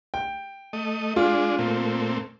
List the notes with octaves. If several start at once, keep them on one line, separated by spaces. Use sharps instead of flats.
G5
A3 D#5
G#3 D4 F4
A#2 A3 C4